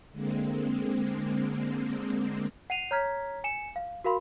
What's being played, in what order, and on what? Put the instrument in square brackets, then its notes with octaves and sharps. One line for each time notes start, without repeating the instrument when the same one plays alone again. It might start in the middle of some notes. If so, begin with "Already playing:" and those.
[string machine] D3 G#3 A#3 C4
[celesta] F#5 C7 D#7 F7
C#5 A#5 F6 G#6 B6
G#5 C#7 E7
F5
F#4 A#4 F5 B5 C6